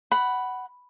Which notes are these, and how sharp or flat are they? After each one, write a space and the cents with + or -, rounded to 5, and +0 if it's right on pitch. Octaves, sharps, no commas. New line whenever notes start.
F#5 +15 B5 +0